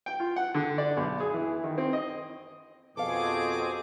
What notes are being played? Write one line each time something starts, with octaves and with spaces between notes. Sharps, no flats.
G5
F4
F#5
D3
D5
B1
G#4
E3
D#3
C4
D#5
F2 B2 C4 G#4 A4 F5 D6